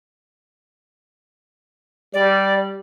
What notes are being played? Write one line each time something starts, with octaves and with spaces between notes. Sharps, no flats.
G3 D5